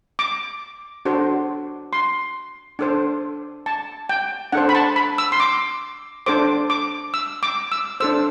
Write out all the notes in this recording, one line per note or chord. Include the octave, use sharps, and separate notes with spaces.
D6
D4 F#4 A4 C5
C6
D4 A4 C5
A5
G5
D4 A4 C5 F#5
B5
A5
B5
E6
C6
D6
D4 A4 C5 D6
D6
E6
D6
E6
D4 A4 C5 E6